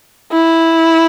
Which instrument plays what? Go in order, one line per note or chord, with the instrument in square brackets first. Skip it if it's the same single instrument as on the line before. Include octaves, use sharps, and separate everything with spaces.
[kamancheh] E4